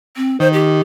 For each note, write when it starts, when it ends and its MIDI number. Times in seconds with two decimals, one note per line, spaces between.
0.17 0.39 60
0.40 0.82 51
0.40 0.48 72
0.53 0.80 67